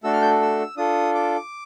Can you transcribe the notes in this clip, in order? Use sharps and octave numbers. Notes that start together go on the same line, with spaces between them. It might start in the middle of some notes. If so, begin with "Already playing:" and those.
A3 D4 F#4 A4 E6
F6
G6
E6
D4 F4 A4 D#6
D6